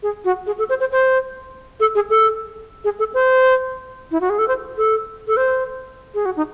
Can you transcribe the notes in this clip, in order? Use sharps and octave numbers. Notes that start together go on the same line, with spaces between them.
G#4
F#4
G#4
A4
C5
C5
C5
A4
G#4
A4
G#4
A4
C5
E4
F#4
G#4
A4
C5
A4
A4
C5
G#4
F#4
D#4